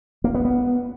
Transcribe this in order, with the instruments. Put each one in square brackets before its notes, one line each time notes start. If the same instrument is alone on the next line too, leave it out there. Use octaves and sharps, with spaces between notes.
[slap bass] A#3
B3
B3